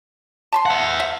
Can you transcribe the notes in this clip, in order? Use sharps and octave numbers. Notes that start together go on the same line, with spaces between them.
A5 B5 C6
E5 F#5
E5